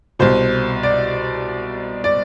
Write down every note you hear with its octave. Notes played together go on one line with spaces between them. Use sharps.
C2 B2 C5
D5
D5